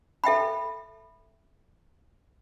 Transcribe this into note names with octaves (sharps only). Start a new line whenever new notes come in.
A4 E5 G5 B5